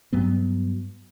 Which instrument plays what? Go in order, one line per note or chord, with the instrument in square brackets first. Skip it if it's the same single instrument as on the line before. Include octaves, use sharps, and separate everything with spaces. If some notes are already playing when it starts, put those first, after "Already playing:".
[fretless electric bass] G2 F#3 B3